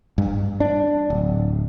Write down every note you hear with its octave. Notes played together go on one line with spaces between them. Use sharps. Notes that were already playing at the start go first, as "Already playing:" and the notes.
G2
D4
D1